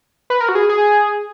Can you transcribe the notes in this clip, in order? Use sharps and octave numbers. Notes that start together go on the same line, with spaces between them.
B4
A#4
F#4
G#4
G#4